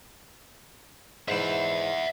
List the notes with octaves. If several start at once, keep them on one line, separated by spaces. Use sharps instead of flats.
G#2 E3 E5 F#5